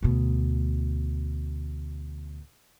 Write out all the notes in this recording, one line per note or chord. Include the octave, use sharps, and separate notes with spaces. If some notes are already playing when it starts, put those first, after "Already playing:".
D2 B2